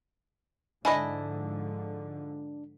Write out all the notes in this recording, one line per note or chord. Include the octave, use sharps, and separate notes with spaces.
G#2 D3 F3 D4 E4 D#5 G#5 B5